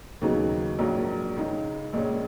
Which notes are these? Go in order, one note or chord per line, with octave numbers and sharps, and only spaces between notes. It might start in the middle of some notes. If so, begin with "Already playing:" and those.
D#2 C#3 F#3 B3 D#4
A#1 G#2 F#3 A#3
C#2 C#3 G#3 D#4
A#1 A#2 G#3 C#4